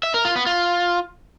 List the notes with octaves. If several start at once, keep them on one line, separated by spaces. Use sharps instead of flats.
E5
A#4
F4
B3
F4